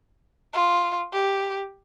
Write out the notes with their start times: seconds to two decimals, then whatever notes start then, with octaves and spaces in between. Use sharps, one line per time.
0.54 F4
1.13 G4